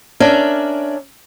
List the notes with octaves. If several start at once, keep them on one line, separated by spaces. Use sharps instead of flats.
C#4 D4 A#4 D5 E5